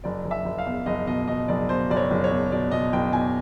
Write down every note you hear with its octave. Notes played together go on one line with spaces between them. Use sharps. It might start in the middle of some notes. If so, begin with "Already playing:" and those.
F#1 D5
F#1
E5
F#1
F5
E2
F#1 D#5
B2 D#5
B2 D#5
F#1 D5
B2 C5
F#1 D5
C#5
F#1
C#5
E2
B2 D5
B2 D#5
F#1 G5
B2 G#5